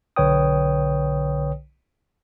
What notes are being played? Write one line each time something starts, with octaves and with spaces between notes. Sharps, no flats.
B1 D3 B4 C#5 G5 D#6